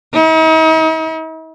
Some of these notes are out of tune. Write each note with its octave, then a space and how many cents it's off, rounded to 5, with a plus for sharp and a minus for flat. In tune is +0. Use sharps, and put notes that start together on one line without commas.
D#4 +45